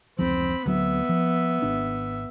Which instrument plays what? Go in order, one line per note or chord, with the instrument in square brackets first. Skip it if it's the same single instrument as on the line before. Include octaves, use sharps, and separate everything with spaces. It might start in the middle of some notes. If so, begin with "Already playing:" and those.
[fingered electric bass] F1 C#2 F3 [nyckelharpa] C4 B5
[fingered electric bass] D2 F#3 [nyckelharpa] B3 E5
[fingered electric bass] F3
G#1 D4